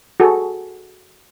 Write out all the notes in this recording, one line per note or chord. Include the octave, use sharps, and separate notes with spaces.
F#4 G#4 A4